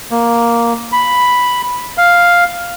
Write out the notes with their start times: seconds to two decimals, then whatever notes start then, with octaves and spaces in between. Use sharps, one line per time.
0.11 A#3
0.92 B5
1.98 F5